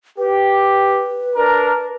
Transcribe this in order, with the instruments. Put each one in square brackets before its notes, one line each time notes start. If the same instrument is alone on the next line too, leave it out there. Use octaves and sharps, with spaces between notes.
[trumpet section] G4 [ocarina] B4
[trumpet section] D4 A#4